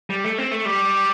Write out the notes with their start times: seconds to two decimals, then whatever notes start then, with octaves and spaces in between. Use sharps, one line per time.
0.10 G3
0.24 A3
0.38 C4
0.51 A3
0.65 G3